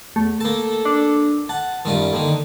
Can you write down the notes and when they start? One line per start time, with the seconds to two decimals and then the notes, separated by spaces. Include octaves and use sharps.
0.16 E2 A3
0.40 A#3 A4 A5
0.85 D4
1.49 F#5 A5
1.85 F#2 D#3 G3 F4
2.13 D3 D#3 A#3